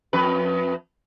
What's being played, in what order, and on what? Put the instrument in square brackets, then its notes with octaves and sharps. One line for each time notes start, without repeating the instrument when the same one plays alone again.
[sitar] F2 B4